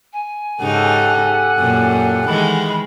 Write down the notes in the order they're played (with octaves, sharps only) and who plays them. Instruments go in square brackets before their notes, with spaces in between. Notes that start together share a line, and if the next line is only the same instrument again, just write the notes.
[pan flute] G#5
[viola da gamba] G#2 C#3 D#4 [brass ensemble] G4 A4 F#5
[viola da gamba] F#2 A#2
[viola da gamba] D#3 E3 G#3 [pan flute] B5